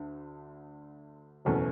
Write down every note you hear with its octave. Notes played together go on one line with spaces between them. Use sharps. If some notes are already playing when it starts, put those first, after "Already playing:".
Already playing: D2 D3
F#1 E2 B2 A3 C#4